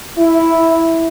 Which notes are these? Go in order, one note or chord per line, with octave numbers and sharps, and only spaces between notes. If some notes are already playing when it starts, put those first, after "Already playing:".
E4